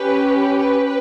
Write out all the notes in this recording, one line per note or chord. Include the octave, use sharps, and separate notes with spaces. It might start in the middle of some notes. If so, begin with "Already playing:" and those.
Already playing: C#4 G4 B4
B4